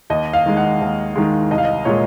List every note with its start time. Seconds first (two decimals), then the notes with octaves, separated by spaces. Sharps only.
0.10 D#2 D#5
0.33 F5
0.46 D#3 G#3
0.57 F#5
0.81 D#2
1.16 D#3 G#3
1.51 C2 D#5
1.58 F5
1.65 D#5
1.85 A#2 G#3 C#5